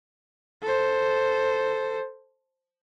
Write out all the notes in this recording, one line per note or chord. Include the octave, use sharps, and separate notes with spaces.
A4 C5